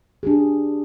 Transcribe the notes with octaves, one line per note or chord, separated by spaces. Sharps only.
D4 G4 G#4